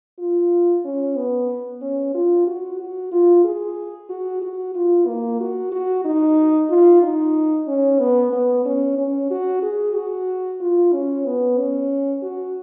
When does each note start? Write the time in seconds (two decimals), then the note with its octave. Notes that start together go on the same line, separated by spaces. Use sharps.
0.19 F4
0.85 C#4
1.17 B3
1.82 C#4
2.14 F4
2.47 F#4
2.80 F#4
3.12 F4
3.45 G#4
4.10 F#4
4.42 F#4
4.75 F4
5.07 A#3
5.40 F#4
5.72 F#4
6.05 D#4
6.70 F4
7.03 D#4
7.68 C#4
8.00 B3
8.33 B3
8.65 C#4
8.98 C#4
9.31 F#4
9.63 G#4
9.95 F#4
10.61 F4
10.93 C#4
11.26 B3
11.58 C#4
12.23 F#4